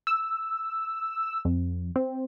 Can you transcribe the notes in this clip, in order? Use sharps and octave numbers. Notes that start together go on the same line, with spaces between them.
E6
F2
C4